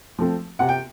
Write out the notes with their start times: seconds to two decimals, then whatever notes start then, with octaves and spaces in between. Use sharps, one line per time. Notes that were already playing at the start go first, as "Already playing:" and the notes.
0.19 F3 A3 C4
0.59 C3 F#5
0.69 G5